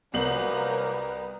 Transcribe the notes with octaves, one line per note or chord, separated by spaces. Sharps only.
C2 F3 F#3 A#3 A#4 B4 F#7